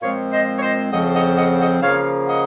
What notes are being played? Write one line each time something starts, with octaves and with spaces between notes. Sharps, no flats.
A#2 F3 G#3 C4 C#5 F5
C5 D#5
C#5
C5 D#5
F2 C#3 F3 C4 D#5 F#5
D#5 F#5
D#5 F#5
D#5 F#5
C#3 F3 A#3 C#5 F5
D#5 F#5